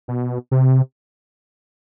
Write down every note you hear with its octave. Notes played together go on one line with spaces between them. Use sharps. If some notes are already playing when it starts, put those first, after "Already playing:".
B2
C3